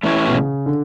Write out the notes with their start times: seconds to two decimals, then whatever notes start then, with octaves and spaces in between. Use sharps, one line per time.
0.03 E3 A3 C#4 E4 G4 C#5
0.27 B2
0.35 C#3
0.66 D3